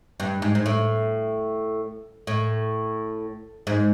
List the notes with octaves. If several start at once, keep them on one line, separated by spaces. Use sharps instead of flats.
G2
G#2
G#2
A2
A2
G#2